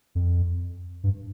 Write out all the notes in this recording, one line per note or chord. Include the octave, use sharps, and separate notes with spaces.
F2
G2